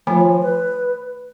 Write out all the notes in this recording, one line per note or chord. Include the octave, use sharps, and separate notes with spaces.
D#3 F3 A3 B5
B4